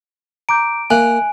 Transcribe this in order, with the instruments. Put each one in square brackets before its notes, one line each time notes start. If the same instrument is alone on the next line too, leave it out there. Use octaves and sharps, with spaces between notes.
[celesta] A#5 D6 G6 [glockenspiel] D7
[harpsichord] A#3 [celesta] E5 F#6 F#7 [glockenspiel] G#5